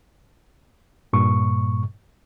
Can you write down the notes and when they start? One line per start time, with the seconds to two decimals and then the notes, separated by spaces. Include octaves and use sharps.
1.13 G2 A#2 C#6